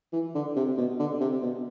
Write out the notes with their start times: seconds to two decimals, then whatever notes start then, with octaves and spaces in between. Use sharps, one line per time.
0.13 E3
0.35 D3
0.56 C3
0.78 B2
0.99 D3
1.21 C3
1.42 B2